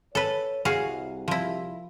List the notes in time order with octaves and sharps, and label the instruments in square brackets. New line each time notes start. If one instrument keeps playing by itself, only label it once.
[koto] A4 B4 [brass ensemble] C#5
[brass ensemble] C2 [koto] F#4 G#4 F5
[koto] F3 E4